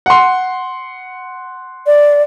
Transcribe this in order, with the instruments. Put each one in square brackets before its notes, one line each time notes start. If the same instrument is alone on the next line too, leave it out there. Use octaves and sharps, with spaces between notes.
[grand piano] F#5 C6
[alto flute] D5